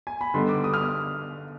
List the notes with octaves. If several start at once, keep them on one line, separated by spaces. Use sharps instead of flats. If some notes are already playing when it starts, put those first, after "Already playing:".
G#5
B5
D3 G3 B3 D#4 C6
D6
D#6
F6
D#6